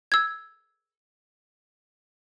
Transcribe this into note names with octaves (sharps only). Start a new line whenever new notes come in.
E6 G#6